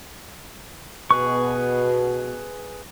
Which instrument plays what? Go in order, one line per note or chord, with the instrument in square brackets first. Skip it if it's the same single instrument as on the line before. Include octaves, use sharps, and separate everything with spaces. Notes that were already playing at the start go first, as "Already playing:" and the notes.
[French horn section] B2 [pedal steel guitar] G#4 B4 C#6